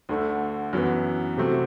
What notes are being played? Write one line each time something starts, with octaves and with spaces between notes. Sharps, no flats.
D2 D3 A3 D4
F#2 E3 B3
C3 F#3 A3 C4